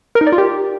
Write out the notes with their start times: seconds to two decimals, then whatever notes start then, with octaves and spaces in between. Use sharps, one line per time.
0.15 A#4
0.21 D#4
0.27 D5
0.32 F4
0.38 G4